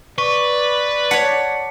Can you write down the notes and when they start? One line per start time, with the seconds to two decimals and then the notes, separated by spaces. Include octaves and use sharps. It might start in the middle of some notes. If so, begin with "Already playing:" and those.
0.18 B4 D5 C#6
1.11 C#5 F#5 A5 B6 C#7